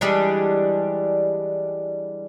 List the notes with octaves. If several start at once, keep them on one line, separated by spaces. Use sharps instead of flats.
E3 G3 G#3 D4